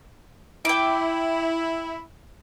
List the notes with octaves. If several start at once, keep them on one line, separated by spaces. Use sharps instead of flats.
E4 G5 D6